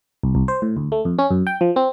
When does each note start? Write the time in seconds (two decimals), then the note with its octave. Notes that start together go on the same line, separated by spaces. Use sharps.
0.23 C2
0.35 C2
0.48 C5
0.62 A2
0.77 D2
0.92 A3
1.05 F2
1.19 C#4
1.31 F#2
1.47 G5
1.61 F3
1.76 C4